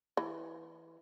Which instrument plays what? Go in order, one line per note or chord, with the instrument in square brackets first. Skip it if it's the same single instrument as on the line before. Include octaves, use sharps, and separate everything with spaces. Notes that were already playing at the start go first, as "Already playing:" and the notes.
[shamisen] E3